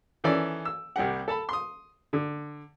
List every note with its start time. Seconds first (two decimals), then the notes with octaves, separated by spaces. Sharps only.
0.24 D#3 E3 C#4 A4 D5
0.65 E6
0.96 C2 G3 G4 F#5
1.28 A4 A5 B5
1.49 C6 D#6
2.13 D3